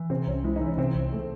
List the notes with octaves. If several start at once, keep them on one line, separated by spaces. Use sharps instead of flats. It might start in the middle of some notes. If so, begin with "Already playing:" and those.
Already playing: E3
C3 C4
C2 C#4
G#3 E4
D#4
E3
C#4
C3 C4
C2
A3